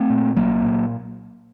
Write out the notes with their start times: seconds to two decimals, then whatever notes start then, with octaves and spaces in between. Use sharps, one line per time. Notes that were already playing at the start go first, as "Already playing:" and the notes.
Already playing: A3 C4
0.10 A#2
0.36 C2 F#3 A#3
0.62 A#2